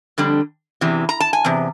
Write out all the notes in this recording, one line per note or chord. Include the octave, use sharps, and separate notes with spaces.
F2 D3 G3
E2 C3 E3
A#5
A5
G#5
E2 C3